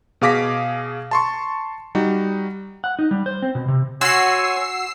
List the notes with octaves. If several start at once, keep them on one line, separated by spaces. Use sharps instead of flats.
B2 G#4 F5 D6 A#6 B6
A5 C6 C#6
G3 D#4 F#4
F#5
D#4
G3
C5
C4
B2
C3
F#4 C#5 G#5 C6 E6 C7